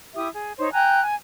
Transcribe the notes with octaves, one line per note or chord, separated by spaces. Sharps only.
E4 G4 E5 D#6
G#4
D#4 C5 C#5
G5 G#5 A#5 F#6
G#5